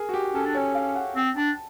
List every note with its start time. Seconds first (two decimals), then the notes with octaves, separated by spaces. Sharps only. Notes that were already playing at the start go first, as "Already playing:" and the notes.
Already playing: G#4 A#4
0.09 F#4
0.14 G4
0.34 C#4 A4
0.45 D4
0.55 C#5
0.57 C#4
0.75 F5
0.95 F#5
1.16 C4 G5
1.36 D4 A5